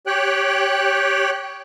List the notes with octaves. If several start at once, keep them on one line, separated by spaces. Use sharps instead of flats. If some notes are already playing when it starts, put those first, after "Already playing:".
G4 C#5 G5 F#6